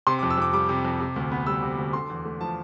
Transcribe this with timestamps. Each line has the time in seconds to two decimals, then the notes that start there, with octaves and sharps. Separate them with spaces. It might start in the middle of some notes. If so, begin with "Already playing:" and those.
0.07 C3 C6
0.19 D6
0.23 F2
0.30 E6
0.38 F2 D6
0.53 G3 D6
0.69 C3
0.85 F2
1.00 C3
1.16 D2
1.32 B3
1.47 G3 E6
1.63 C3
1.78 D2
1.93 D3 C6
2.10 E2
2.25 A3
2.41 F3 A5